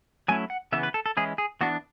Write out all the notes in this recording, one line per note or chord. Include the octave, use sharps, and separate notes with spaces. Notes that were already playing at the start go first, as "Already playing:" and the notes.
F#3 A3 C#4 E4 G#5
F#5
C#3 E3 B3 E5
B4
A4
A4
E3 G#3 C#4 E4 G#4
G#4
E3 B3 D4 F#4